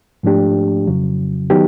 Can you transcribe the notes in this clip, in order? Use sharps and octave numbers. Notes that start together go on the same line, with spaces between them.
G#2 F3 A3 D4 G4
F2 C#3 F#3
D#3 F#3 B3 D#4 G4